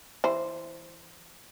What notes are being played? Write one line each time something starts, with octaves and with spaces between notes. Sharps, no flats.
E3 C5